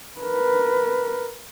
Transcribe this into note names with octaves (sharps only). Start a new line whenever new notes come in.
A#4 B4